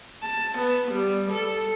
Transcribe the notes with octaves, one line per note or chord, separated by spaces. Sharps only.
A5
B3
G3
A4